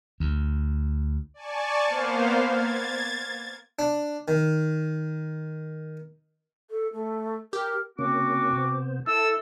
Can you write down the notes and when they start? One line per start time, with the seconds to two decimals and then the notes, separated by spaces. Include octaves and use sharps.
0.20 D2
1.34 D5 G#5 A5 C#6
1.84 A#3 B3 C5 F5
2.43 G#6 A6
3.79 D4
4.28 D#3
6.70 A4
6.93 A3
7.53 G4 A#4
7.99 C#3 A#3 C4 C#4 F#4 D6
8.53 C3 B3 C5
9.07 E4 A4 E6